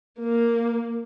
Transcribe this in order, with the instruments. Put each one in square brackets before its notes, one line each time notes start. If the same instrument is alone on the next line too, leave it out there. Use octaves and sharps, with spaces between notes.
[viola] A#3